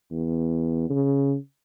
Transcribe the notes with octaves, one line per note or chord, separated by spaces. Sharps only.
E2
C#3